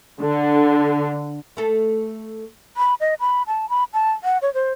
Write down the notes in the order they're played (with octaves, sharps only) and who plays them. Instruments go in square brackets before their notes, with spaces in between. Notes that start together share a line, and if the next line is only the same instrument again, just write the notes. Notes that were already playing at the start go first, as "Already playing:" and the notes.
[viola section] D3
[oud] A3 A4
[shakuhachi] B5
D#5
B5
A5
B5
A5
F#5
C#5
C5